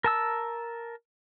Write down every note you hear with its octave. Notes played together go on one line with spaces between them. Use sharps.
A#4 A5 E6